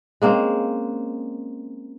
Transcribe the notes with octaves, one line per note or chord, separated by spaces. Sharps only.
G#3 A#3 C4 C#4